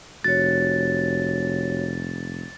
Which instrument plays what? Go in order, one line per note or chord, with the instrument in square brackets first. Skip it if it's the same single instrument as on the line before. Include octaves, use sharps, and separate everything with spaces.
[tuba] F1 [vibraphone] F#4 C#5 [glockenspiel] A6